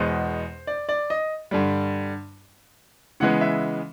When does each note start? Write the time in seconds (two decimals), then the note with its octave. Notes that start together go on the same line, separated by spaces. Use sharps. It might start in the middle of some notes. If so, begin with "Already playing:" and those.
Already playing: E2 B2 G#3 B3 C5
0.67 D5
0.89 D5
1.10 D#5
1.51 G2 D3 G3
3.20 C#3 E3 G#3 B3 F#5
3.41 E5